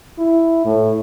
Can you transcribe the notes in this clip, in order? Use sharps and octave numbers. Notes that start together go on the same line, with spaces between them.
E4
A2